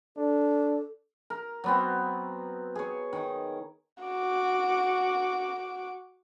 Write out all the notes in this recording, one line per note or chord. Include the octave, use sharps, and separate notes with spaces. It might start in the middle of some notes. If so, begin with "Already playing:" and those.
D4 A4
A#4
F#3 B3 C4
G#4 C#5
D#3
F#4 D6